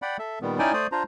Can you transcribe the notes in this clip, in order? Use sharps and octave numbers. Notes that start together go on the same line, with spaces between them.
D5 F#5 G5 B5
A4 E5
A#2 D#3 G3 B3
C#4 D#4 E4 D5 G5 G#5
A3 C5 D5 D#6
D4 F4 C5 A#5